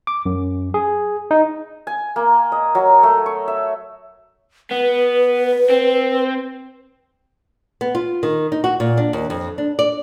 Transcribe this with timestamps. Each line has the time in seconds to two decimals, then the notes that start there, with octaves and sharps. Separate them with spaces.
0.07 D6
0.26 F#2
0.74 G#4
1.31 D#4
1.87 G#5
2.16 A#3
2.52 D#5
2.75 F#3
3.03 A3
3.26 C#6
3.48 E5
4.71 B3 B4
5.70 C4
7.81 B3
7.95 F4
8.23 D#3
8.52 D#4
8.64 F#4
8.80 A#2
8.97 D4
9.13 D#2
9.30 F2
9.58 D4
9.79 D5